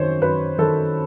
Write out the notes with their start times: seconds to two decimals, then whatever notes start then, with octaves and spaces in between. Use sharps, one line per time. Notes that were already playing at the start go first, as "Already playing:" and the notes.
Already playing: F#2 D#3 C5 C#5
0.21 F#2 B4
0.58 D#3 A4